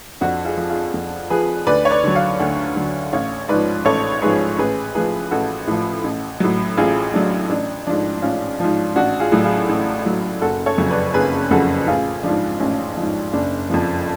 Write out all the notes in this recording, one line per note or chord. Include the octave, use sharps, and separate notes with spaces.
F2 D4 F#4
F4 G#4
F3
F4 G#4
F2
F3 G#4 B4
D2 B4 D5
C#5
B4 D5
D3 F#3
C#5 F5
D2 D5 F#5
D3 F#3
A1 C#5 F5
G#2 F3 B4 D5
A1 A4 C#5
G#2 F3 G#4 B4
A1 G#4 B4
A2 F3 G#4 B4
A1 F#4 A4
A2 F3
A1
A2 F#3
A1 F4 G#4
A2 F#3 D4
A1 D4
G#2 F3 D4
A1 C#4 F4
G#2 F3
A1 D4 F#4
F4 G#4
A2 F#3
F4 G#4
A1
A2 F#3
F#1 F#4 A4
A4 C#5
F2 C#3 F#3
B4 D5
F#1 G#4 B4
F2 C#3 F#3 F#4 A4
A1 F4 G#4
G#2 F3 D4
A1 C#4
G#2 F3
F#1 D4
F2 F3